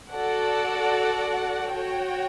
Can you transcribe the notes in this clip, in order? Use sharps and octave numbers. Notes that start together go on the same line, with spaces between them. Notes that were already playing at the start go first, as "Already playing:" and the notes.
F#4 A4 D5 F#5
F#4 C#5 G5